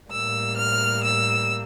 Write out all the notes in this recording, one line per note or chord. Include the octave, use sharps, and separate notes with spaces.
A2 G3 A#3 E6
F6
E6